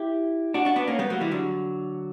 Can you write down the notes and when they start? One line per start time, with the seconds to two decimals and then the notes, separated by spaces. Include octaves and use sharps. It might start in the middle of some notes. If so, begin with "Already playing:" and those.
Already playing: E4 G4
0.54 D4 F#4
0.65 D4 F#4
0.76 B3 D4
0.87 A#3 C#4
0.99 G3 B3
1.10 F#3 A#3
1.20 E3 G3
1.31 D3 F#3